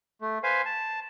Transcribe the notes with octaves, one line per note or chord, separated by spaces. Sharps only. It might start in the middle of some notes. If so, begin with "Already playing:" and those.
A3
B4 C5 F5 G#5
A5